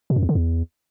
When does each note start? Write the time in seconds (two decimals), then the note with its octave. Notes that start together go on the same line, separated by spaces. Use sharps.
0.10 B2
0.16 F#2
0.23 E2
0.29 D3
0.35 E2